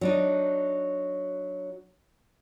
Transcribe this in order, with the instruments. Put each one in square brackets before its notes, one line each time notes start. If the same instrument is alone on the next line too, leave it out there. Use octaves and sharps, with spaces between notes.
[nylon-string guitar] F#3 D4 D#4